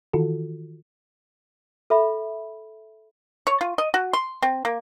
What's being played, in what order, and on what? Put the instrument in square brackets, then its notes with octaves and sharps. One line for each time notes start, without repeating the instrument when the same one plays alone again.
[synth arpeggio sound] D#3 E3 F4 F#4 A4
[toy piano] A4 E5 B5
[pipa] C#5
F4
D#5
F#4
C6
C4
A#3